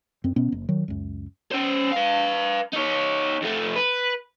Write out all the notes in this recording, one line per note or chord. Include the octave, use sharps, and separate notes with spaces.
F#2 C4
B2 B3 C#4
F#1
D#3 F#3
C#2 F#2
C#4 C5
B4 F5
D#4 C#5
F2 A3
B4